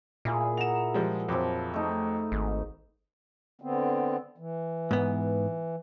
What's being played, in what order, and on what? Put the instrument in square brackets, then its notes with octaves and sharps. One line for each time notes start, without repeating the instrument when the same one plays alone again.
[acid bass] A#2 [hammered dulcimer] E4 G#4
[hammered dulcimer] F#5 A#5 [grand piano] E7 F7
[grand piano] F3 G3 G#3
[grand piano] F2 F#3 D6 [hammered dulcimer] F3 B5
[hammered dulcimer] A3 D#4
[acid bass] G#1
[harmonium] D3 B3 C4
E3
[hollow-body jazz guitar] G#2 B3